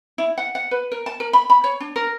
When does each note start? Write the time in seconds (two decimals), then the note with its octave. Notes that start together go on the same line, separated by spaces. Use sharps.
0.18 E4
0.38 F#5
0.55 F#5
0.71 B4
0.92 A#4
1.06 A5
1.20 A#4
1.33 B5
1.50 B5
1.64 C#5
1.80 D4
1.96 A#4